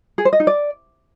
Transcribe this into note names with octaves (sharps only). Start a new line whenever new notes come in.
G#4
C5
D#5
D#4
D5